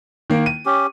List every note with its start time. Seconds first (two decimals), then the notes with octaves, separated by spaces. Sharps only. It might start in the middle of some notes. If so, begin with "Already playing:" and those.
0.30 D#3 A#3
0.46 D#7
0.66 C#4 G4